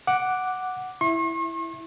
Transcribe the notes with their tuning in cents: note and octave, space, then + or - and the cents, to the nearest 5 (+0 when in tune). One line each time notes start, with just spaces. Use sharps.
F#5 +0 D6 +0
E4 +0 C#6 -45